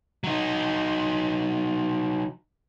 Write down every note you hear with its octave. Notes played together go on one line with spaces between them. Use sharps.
F#3 D#4